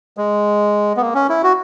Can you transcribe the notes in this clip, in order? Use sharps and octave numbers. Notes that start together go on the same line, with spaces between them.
G#3
B3
A#3
C#4
E4
F#4